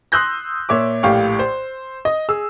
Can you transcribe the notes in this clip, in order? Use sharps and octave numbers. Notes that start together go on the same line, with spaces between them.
C6 D#6 E6 F#6 G6 A#6
A#2 C#5 E5 D6
A#1 A2 G4 F5 C#6
C5
D#5
G#4 E6